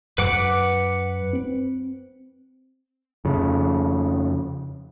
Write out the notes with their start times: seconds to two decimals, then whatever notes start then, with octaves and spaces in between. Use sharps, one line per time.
0.18 F#2 F#3 B4 F#5 D6
1.33 C4
3.25 F2 C#3